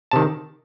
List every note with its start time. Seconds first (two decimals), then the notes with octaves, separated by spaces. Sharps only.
0.11 C3 D#3 A5